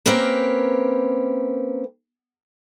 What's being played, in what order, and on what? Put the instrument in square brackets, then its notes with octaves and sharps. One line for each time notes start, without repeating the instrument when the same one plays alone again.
[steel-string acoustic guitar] A#3 C4 C#4 G4 A#4 B4